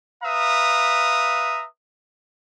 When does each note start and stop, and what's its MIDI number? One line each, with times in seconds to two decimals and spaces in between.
0.23 1.65 71
0.23 1.65 76
0.23 1.65 77
0.23 1.65 82
0.23 1.65 87